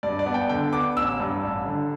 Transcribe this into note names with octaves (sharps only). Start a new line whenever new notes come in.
G2 D5
D5
B3
G5
D3 G5
B3 D6
A1 E6
G2
A1
D3